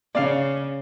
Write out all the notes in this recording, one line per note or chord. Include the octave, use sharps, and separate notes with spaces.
C#3 D5 F5